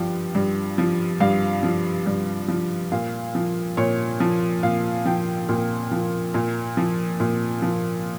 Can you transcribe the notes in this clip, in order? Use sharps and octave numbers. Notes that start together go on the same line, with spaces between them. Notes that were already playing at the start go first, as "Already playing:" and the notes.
Already playing: G2 F3 G5
G2
F3
G2 F5
F3
G2
F3
A#2 F5
F3
A#2 C#5
F3
A#2 F5
F3 G5
A#2
F3
A#2
F3
A#2
F3